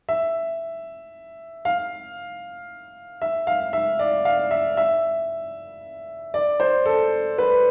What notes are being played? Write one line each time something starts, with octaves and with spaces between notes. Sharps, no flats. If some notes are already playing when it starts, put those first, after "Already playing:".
E5
F5
E5
F5
E5
D5
F5
E5
E5
D5
C5
A4
B4